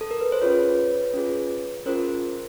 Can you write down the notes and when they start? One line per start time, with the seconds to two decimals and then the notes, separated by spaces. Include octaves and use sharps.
0.01 A4
0.11 A#4
0.21 B4
0.32 C5
0.42 C#4 F4 G#4 B4 C#5
1.14 C#4 F4 G#4
1.86 C#4 F4 G#4 A#4 C5